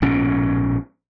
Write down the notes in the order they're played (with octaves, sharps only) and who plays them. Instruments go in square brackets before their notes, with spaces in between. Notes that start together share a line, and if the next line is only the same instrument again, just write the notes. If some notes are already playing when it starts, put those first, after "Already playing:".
[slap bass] A#1 G#2 B2 C#4